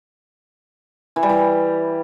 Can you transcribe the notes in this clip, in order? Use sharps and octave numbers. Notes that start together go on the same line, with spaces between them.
E3
G3
E3